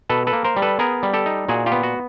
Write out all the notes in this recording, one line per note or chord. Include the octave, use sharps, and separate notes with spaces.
B2 A4 B4
A4 B4
A#3
A#4 C5
G3
A4 B4
B3 G#4 A#4
G3
G4 A4
D#4
A#2 F#4 G#4
F4 G4
B3
F#4